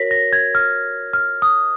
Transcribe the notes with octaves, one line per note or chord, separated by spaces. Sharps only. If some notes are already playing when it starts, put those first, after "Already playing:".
Already playing: F#4 A#4 C#5 A#6 B6
A#6
G#6
F6
F6
D#6